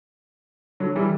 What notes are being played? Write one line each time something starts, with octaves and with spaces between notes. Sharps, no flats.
D3 F#3
E3 G3